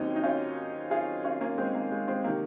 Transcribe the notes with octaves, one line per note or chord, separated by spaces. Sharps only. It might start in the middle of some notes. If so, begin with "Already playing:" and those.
Already playing: D#2 D#3 F#3 A#3 C4 C#4 D#4
D#4
C#4 F4
F4 G#4
C#4 F4
A#3 C#4
G#3 C4
A#3
G#3
G#3 C4
C3 D#3 A#3